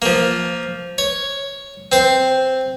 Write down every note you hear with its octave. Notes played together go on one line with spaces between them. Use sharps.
F3 A#3
C#5
C4 C5